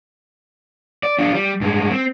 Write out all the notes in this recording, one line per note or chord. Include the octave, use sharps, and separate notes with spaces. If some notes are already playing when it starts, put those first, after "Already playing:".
D5
D4 F4
G3
G2 G#3
C4